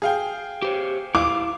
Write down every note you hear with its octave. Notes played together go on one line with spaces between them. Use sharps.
G#4 F5 G5
G4 C5 C#5
E4 F5 D6